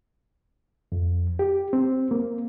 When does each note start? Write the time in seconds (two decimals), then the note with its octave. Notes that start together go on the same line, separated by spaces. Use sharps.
0.92 F2
1.39 G4
1.73 C4
2.11 A#3